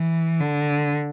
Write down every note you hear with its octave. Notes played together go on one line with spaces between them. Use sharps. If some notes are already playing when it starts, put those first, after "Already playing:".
Already playing: E3
D3